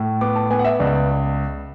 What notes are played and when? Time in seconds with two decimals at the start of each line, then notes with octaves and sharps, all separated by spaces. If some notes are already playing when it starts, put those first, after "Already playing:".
Already playing: A2
0.21 B3 D6
0.36 A5
0.51 B3 G#5
0.59 F#5
0.64 E5
0.80 C#2 D5